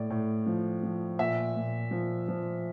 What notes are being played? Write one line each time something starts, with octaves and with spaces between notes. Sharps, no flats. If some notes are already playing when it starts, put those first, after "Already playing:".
Already playing: A2 D5
A2
F3
F3
A#2 E5
A#2
F3
F3